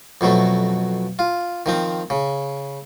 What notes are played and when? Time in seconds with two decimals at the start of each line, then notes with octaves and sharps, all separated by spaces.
0.21 F2 B2 F#3 A3
1.19 F4
1.66 D#3 F3 C4
2.10 C#3